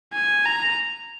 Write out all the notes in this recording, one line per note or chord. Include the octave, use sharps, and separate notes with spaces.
G#5
A#5